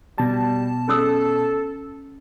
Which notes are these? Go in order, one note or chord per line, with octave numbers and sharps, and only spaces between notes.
B2 G3 A5
C#4 A4 D#6 E6